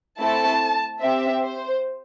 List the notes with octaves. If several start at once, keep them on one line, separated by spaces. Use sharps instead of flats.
A3 C4 E4 A4 A5
C4 G4 E5
C5